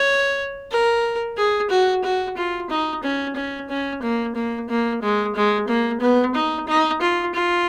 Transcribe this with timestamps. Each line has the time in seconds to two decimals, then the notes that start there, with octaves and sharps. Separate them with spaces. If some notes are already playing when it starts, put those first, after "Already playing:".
Already playing: C#5
0.71 A#4
1.37 G#4
1.70 F#4
2.04 F#4
2.37 F4
2.70 D#4
3.03 C#4
3.36 C#4
3.69 C#4
4.02 A#3
4.35 A#3
4.69 A#3
5.02 G#3
5.35 G#3
5.68 A#3
6.01 B3
6.35 D#4
6.67 D#4
7.01 F4
7.34 F4